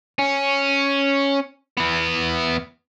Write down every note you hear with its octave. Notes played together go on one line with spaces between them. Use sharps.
C#4
E3 B3